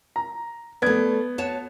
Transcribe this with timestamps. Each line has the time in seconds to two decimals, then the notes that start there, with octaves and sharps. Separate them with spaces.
0.16 A#5
0.82 A3 B3 D5 G#6
1.38 F#4 C#5 A5